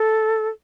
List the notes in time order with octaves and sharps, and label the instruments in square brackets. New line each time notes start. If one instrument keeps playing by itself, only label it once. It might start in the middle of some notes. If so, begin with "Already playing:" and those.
Already playing: [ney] A4